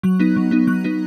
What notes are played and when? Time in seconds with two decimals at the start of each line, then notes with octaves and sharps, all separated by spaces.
0.03 F#3 F#6
0.19 B3 D#4
0.36 F#3
0.51 B3 D#4
0.67 F#3 F#6
0.84 B3 D#4